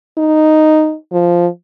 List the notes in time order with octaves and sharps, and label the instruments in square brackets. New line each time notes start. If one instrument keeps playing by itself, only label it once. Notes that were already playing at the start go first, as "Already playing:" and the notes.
[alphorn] D#4
F3